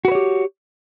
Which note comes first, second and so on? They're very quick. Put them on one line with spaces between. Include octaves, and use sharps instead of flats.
F#4 B4 C#5 G4